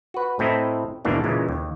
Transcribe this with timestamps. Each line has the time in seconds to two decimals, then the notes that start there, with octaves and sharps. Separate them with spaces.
0.14 F#4 B4
0.39 A2 C4 E4 A4 D#5 A#5
1.05 D#2 G#2 B2 E3 A#3 D4
1.24 A#2 C#3 E3 G#3
1.49 D#2